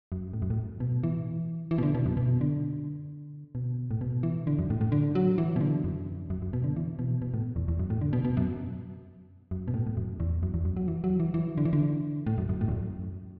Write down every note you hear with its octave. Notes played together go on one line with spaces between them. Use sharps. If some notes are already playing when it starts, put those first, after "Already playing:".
F#2
A2
F#2
A2
B2
E3
E3
B2
D3
B2
F#2
B2
D3
B2
A2
B2
E3
D3
F#2
A2
A2
D3
F#3
E3
B2
D3
F#2
F#2
F#2
B2
D3
E3
B2
B2
A2
E2
E2
F#2
A2
D3
B2
B2
F#2
F#2
B2
A2
A2
F#2
E2
F#2
E2
F#2
F#3
E3
F#3
E3
E3
D3
E3
D3
A2
F#2
F#2
A2
E2
F#2